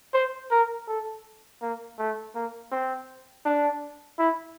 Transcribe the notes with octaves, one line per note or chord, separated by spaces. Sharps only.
C5
A#4
A4
A#3
A3
A#3
C4
D4
E4